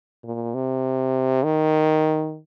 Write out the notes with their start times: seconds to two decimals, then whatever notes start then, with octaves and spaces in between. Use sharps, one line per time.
0.24 A#2
0.55 C3
1.45 D#3